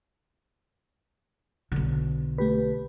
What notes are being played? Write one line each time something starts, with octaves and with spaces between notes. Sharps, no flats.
B1 D3
A3 G4 B4